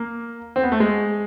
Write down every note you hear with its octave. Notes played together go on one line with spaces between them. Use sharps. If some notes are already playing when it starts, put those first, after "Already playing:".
Already playing: A#3
C4
B3
A3
G#3